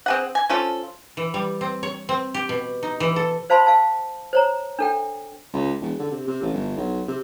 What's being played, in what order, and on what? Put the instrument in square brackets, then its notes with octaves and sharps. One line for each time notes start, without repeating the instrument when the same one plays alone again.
[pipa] C4 G#4 F#5
G#5
F3 C#4 F4 A4
[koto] E3
G3
C4
C#5
C4
G4
B2
D#4
E3
A4
[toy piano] C5 F5 A5 B5 C6
F5 A5
C5 C#5 A#5
D4 A4 G5
[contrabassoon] C#2
E1
D3
C3
C3
A1
G1
B1
C3